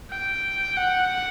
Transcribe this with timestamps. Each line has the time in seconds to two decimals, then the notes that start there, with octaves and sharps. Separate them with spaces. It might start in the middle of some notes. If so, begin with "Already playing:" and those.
0.12 G5
0.77 F#5